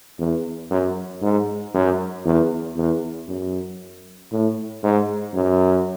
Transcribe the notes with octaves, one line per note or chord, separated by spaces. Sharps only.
E2
F#2
G#2
F#2
E2
E2
F#2
A2
G#2
F#2